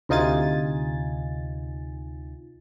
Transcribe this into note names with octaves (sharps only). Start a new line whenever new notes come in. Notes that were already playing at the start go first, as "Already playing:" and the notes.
D2 C3 D#4 F4 G#5 A6